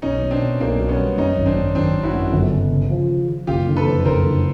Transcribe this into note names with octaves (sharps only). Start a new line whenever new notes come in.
B1 C#4 D#4
B2
C4 D4
B2
B1 A#3 C4
B1
B3 C#4
G3
F#2 C#4 D#4
G#1
C4 D4
F#2
G#1 C4 D4
G#1
E4 F#4
F#2
G1
C#3
C#3
F3
F3
F3
F#1 F4 G4
D3
A4 B4
F2
F#1 A#4 C5
D3